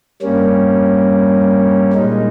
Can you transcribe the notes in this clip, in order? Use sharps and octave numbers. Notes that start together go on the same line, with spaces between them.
G2 G3 A#3 C#4
A#2 G#3 D#4